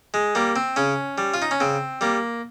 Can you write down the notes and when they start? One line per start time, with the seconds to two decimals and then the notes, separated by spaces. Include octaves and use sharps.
0.14 G#3
0.35 G3 A#3
0.56 C4
0.76 C#3 C#4
1.18 G3
1.34 F4
1.42 D#4
1.51 C#4
1.60 C#3 C4
2.01 G3 A#3